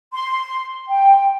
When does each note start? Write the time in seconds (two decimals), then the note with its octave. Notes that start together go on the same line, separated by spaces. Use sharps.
0.13 C6
0.89 G5